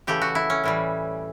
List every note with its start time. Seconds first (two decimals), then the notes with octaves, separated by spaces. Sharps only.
0.07 C#3 E3 A3 G4
0.22 F#4
0.35 E4
0.50 C#4
0.64 A2 E3 G3